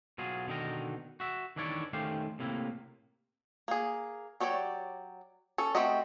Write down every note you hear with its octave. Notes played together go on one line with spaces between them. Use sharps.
B2 F#3 F4 G#4
B2 D3 D#3 D#4 A#4
F#4 E5
D#3 E3 D4 E4 C#5 D5
D#3 A3 C#4 G4 C5 F5
A2 C3 A#3 E4
A#3 G#4
F#3 G4 C#5 D5
C#4 A4
A3 C4 F#4 G4 D#5